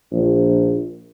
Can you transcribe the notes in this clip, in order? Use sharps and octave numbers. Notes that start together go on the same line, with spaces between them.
A#1